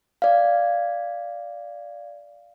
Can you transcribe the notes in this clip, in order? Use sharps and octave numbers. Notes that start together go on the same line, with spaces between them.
D5 F5